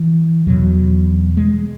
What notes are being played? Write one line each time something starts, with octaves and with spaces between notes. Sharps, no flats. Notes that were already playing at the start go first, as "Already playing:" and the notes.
Already playing: E3
E2 B2 F#3
G#3